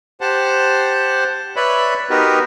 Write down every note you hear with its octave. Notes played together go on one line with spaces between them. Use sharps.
G4 C5 F#5 A5
B4 C#5 D5 E5 B5
B3 D#4 F#4 G4 A#4 B4